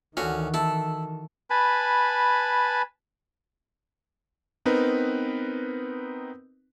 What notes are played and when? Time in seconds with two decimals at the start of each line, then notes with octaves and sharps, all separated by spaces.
0.17 D2 D#3 E3 C#4 F#4
0.54 E4 A4
1.50 B4 G#5 A5 B5
4.65 B3 C4 D#4 A#4 B4